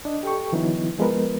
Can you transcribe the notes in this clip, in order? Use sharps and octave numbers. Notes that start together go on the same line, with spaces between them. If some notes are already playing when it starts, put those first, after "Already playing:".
D4 D#5
G4 A4 G5 C#6
D3 E3 F#3 B3 D#4 E4
F3 G#3 B3 A#4 B4